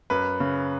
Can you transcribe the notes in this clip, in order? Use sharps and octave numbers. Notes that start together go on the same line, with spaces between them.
F#2 B4
C#3